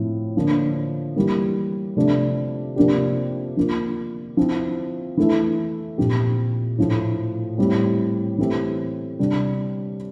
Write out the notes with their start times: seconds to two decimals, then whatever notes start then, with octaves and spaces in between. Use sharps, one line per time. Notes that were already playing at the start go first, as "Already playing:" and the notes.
Already playing: A2 F3 C4
0.36 D3 F3 A#3 D4
1.16 E3 G3 A#3
1.97 C3 F3 A3 D4
2.76 C3 F3 A#3 D4 G4
3.57 F3 A#3 F4
4.37 F3 C4 E4
5.17 E3 A3 E4
5.98 A#2 F3 C4 G4
6.78 A2 F3 A3
7.58 A2 G3 C4
8.38 E3 A3 C4 G4
9.19 C3 G3 D4 G4